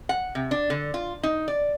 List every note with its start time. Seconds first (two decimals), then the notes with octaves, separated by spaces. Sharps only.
0.09 F#5
0.35 C3
0.51 D4
0.70 D3
0.94 F4
1.23 D#4
1.48 D5